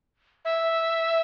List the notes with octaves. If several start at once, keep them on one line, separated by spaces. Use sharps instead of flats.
E5